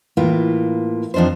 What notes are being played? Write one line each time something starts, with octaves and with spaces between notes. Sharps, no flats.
A2 E3 A#3 F4
F2 F3 D4 D#4 C5